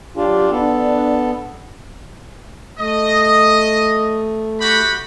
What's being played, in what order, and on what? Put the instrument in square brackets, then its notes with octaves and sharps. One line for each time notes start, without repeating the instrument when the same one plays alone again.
[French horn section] F#3 G4 [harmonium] D4 F4
[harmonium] B3 A4 [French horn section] D4
[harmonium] A3 [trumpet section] D#5
[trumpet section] F#4 G4 B5